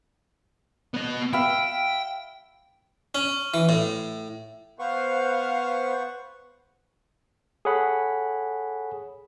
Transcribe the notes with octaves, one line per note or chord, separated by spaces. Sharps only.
B3 D#5
E5 F5 G5 B5
C#4
E3
A2
B3 B4 C5 F5 F#5 C#6
G#4 A4 C#5 F#5 B5